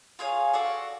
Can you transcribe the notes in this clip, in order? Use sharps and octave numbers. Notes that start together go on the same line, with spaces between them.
F4 G#4 C#5 F5
F#4 A4 D5 F5